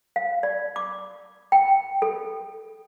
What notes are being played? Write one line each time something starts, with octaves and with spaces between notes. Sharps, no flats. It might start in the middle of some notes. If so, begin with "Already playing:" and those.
F5
D5
D6
G5
A4